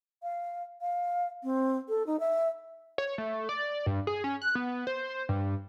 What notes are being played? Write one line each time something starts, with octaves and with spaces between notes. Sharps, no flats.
F5
F5
C4
A4
D#4
E5
C#5
A3
D5
G2
G#4
C#4
F#6
B3
C5
G2